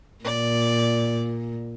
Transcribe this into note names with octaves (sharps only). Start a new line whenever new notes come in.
A#2 D5